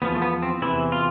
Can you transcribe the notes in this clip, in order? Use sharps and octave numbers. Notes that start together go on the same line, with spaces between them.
E2 D3 F3 B3
A3
B3
C4
E2 C3 E3 E4
F4